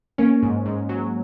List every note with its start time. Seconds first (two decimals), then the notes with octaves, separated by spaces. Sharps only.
0.18 A#3 C#4
0.43 G#2
0.66 G#2
0.89 F#3